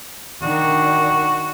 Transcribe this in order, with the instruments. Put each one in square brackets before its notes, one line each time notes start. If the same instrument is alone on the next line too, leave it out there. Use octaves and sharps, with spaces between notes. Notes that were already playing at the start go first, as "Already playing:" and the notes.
[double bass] D#3 D4 [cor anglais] F#4